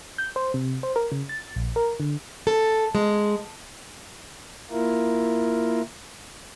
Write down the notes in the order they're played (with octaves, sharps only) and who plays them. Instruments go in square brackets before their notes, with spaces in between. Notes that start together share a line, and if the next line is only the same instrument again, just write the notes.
[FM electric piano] G6
C5
C3
C5
A#4
C#3
A6
A#1
A#4
D3
[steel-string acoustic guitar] A4
G#3
[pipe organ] A#3 E4 F4 A#4